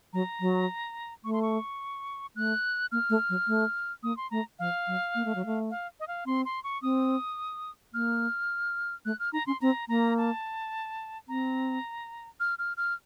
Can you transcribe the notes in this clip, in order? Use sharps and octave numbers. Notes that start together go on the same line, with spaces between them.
F#3 A#5
F#3
A3 C#6
C6
C#6
A3 F#6
A#3 F6
A3
F#3
A3
A#3 D#6
C6
A3 A#5
F3 F5
F#3
A#3
A3
F#3
A3
F5
D#5
F5
C4 C6
C6
C#6
C4 D#6
A#3 F6
A3 F#6
F6
D#4 A#5
C#4 C6
C4 A#5
A#3 A#5
A5
C4 A#5
F6
F6
F6